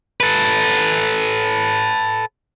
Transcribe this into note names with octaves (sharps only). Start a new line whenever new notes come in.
A4 B4